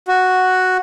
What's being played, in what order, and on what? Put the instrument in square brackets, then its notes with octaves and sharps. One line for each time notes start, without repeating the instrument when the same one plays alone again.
[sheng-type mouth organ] F#4